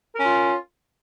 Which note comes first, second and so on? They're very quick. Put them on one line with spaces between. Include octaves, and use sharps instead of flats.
A#4 C#4 F4